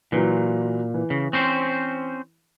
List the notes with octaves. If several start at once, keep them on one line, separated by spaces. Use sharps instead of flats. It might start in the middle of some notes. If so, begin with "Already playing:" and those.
A#2 E3 F#3
E3
C#3
C4 C#4 C5